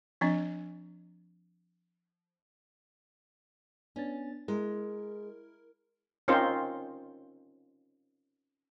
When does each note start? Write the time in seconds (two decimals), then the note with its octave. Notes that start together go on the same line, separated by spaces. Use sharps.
0.21 F3 C4 D4 D#5
3.96 B3 C#4 D4 A6
4.48 G#3 E4 A#4
6.28 C4 C#4 D#4 F4 A#4 C5